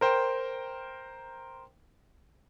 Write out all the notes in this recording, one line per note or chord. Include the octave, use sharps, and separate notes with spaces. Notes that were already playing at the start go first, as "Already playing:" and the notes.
A#4 C5 G5